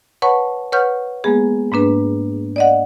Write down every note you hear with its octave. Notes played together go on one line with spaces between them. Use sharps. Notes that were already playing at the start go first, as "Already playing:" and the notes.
B4 C#5 F#5 A5 B5 C#6
B4 C#5 F#5 C#6 F6 G6
G#3 A#3 B3 G#4
G#2 A#3 D4 B4
D5 D#5 F#5